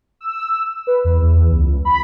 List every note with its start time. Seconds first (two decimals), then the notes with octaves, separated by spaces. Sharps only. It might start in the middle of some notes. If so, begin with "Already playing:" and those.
0.21 E6
0.87 B4
1.04 E2
1.22 E2
1.51 C#2
1.85 B5